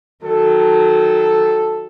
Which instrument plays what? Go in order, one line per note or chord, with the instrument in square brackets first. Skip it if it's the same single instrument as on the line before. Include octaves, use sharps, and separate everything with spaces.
[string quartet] D#3 F#3 [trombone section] A4